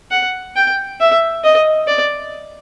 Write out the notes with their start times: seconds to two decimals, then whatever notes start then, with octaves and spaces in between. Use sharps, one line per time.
0.11 F#5
0.56 G5
1.00 E5
1.44 D#5
1.87 D5